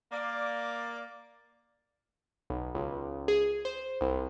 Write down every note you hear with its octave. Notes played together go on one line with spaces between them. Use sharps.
A#3 D5 F5
B1
C#2
G#4
C5
C2